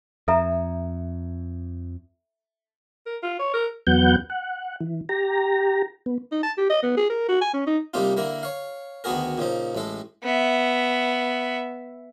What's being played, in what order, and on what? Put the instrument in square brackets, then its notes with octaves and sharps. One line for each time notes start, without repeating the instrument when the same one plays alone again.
[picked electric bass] F2 [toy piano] A4 E5 A#5
[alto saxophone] A#4
F4
C#5
A#4
[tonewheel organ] E2 F#3 B3 F#5 G6
F#5
E3
G4 A#5
B3
[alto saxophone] D#4
A5
G4
D#5
B3
G#4
A#4
F#4
G#5
C#4
D#4
[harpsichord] C3 G3 A#3 C4 D#4 F4
D3 A#3 E4 A#4
C#5 F5
D2 D#3 B3 F#4 G#4 A#4
A#2 C#3 F3 D#4
A1 A2 G#3 A4
[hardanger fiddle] B3 E5